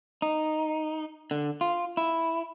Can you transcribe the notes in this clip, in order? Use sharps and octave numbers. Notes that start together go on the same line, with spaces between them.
D#4
D3
F4
E4